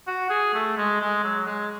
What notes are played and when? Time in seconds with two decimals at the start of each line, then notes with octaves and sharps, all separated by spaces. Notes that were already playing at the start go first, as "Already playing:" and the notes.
0.07 F#4
0.30 G#4
0.54 A3
0.77 G#3
1.01 G#3
1.24 F#3
1.46 G#3